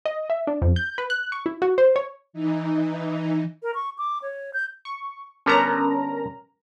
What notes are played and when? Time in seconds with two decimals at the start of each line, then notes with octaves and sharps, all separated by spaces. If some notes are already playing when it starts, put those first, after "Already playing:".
0.05 D#5
0.30 E5
0.47 D4
0.62 F2
0.76 G6
0.98 B4
1.10 F#6
1.32 C#6
1.46 E4
1.62 F#4
1.78 C5
1.96 C#5
2.33 E3 D#4
3.63 A#4
3.75 C#6
3.98 D6
4.22 C#5
4.54 G6
4.85 C#6
5.46 D3 G3 B3 C#4 A#4 A#5